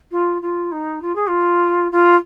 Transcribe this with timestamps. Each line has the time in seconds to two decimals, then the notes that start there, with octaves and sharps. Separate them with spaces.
0.11 F4
0.41 F4
0.71 D#4
1.02 F4
1.15 G#4
1.28 F4
1.91 F4